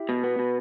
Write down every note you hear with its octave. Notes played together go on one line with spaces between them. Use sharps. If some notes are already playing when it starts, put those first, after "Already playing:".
Already playing: E4 G4
B2
B3
B2